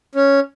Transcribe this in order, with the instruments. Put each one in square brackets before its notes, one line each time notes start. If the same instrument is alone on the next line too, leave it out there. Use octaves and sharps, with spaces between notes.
[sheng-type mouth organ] C#4